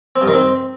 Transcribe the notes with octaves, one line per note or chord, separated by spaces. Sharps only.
C4
G2
D#3
C4